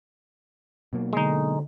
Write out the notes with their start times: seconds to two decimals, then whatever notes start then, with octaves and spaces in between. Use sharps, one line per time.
0.93 B2 F#3 A#3
1.13 D3 G#3 D#4